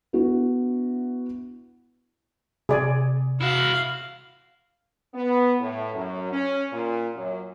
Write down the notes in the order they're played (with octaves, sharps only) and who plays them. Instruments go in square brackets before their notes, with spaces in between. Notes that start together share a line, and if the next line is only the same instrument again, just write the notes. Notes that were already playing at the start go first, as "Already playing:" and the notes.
[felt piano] B3 D4 E4 F#4
[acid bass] C3 [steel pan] G#4 D5 G#5
[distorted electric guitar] E4 F#4 [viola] F5
[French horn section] B3
A2
F#2
C#4
A#2
F#2